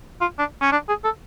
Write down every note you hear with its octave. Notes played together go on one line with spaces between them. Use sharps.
F4
D4
C#4
D4
G#4
A4